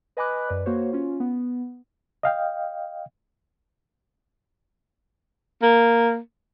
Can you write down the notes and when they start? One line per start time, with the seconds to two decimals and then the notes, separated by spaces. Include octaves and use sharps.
0.17 B4 D#5 G#5 B5 D6 F#6
0.49 F#2 B4 D5
0.66 A#3 F#4 C5 C#5
0.93 C#4 F4
1.20 B3
2.23 D#5 F5 G5
5.62 A#3